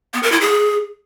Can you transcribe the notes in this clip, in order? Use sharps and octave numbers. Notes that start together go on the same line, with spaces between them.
B3
A#4
E4
G#4